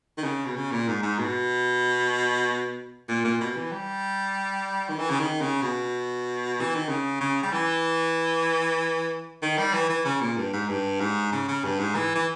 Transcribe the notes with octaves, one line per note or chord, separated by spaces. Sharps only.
D#3
C#3
B2
C#3
A#2
G#2
G#2
B2
A#2
A#2
B2
E3
G3
D#3
E3
C#3
D#3
C#3
B2
E3
D#3
C#3
C#3
G3
E3
D#3
G3
E3
E3
C#3
A#2
G2
G#2
G2
G#2
C#3
C#3
G2
G#2
E3
E3